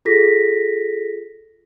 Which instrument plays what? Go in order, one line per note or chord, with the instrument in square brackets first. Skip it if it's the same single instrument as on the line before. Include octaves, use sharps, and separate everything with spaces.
[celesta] F4 G#4 A4 A#6 B6